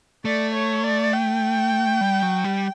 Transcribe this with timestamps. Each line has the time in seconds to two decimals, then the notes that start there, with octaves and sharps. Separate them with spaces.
0.25 A3 D5
0.54 C#5
0.83 D5
1.13 G5
2.01 G3
2.22 F#3
2.44 G3